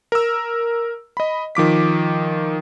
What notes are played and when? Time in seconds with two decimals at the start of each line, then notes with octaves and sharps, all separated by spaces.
0.12 A#4 E6
1.17 D#5 B5
1.55 D#3 F3 D6 B6